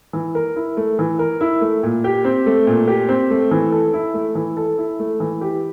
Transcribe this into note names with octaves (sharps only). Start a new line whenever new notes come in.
E3
A#4
E4
A3
E3
A#4
E4
A3
A#2
G4
C4
A3
A#2
G4
C4
A3
E3
A4
E4
A3
E3
A4
E4
A3
E3
G4